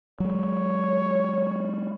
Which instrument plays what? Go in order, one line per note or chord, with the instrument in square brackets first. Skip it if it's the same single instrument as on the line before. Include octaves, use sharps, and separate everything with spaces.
[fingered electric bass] F#3 G#3 [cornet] C#5